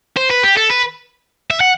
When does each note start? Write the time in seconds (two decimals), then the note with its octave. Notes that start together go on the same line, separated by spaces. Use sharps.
0.17 C5
0.30 B4
0.43 G4
0.57 A4
0.70 B4
1.50 E5
1.60 F#5